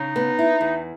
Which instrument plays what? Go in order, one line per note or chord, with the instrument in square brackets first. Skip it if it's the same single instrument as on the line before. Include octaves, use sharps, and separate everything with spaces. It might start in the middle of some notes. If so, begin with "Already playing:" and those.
Already playing: [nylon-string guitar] C#3 [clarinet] D#4
[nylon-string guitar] B3
E4
E2